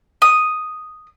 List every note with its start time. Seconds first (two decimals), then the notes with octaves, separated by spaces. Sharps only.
0.22 D#6